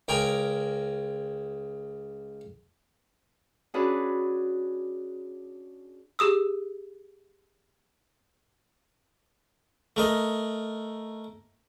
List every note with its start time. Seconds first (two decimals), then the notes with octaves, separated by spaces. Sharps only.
0.08 C#2 A#4 G5 G#5 A#5
3.74 C#4 D4 F#4 G#4 B4
6.19 G4 G#4 D#6 E6
9.96 A3 A#4 D#5